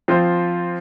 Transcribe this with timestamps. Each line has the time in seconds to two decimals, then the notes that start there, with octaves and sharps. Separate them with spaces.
0.08 F3 C4 F4 C5